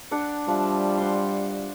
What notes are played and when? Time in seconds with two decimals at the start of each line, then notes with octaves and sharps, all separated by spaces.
0.11 D4 D5 F#5
0.48 F3 G3 E5
0.98 F#5 C6